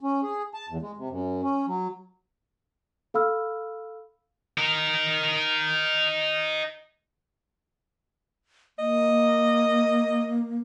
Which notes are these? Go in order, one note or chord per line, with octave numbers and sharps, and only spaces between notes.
C#4
G#4
A5
E2
G#3
C3
F#2
C#4
F#3
A4 F5 B5 E6 F6
D#4 A#4
A#3 D#5